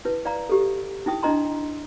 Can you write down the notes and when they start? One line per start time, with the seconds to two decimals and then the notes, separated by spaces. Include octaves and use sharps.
0.05 E4 B4
0.25 D5 F5 A#5
0.49 G4 A4
1.06 D#4 E4 G5 D#6
1.23 D4 E4 D#5 A#5 C6